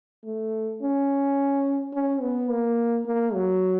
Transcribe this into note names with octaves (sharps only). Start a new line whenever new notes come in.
A3
C#4
C#4
B3
A#3
A#3
F#3